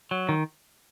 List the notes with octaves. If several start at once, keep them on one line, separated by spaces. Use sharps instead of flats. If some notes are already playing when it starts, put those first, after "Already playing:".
F#3
D#3